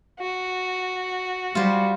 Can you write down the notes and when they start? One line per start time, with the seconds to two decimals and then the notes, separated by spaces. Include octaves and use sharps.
0.20 F#4
1.55 G3 F4 C5